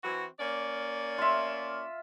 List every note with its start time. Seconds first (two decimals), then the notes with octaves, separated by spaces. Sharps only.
0.04 E3 C4 F#4
0.39 A#3 C#4 D5
1.18 F4 E5